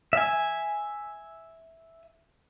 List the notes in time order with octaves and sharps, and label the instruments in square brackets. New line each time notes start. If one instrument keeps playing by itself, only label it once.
[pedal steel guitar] E5 G#5